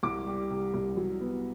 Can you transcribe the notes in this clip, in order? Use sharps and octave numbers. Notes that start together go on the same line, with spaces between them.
C2 D6
G3
C3
C2
F#3
B3